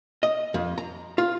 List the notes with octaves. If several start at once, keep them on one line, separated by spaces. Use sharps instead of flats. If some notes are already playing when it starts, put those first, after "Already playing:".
D#5
F2
A#5
F4